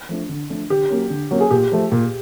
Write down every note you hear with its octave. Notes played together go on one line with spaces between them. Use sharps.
F3 A3 D4
D3
F3 A3 D4
D3 G4
F#3 A#3 C#4
D3
F#3 A#3 C#4
G#4
A#2 G4
F3 A3
A#2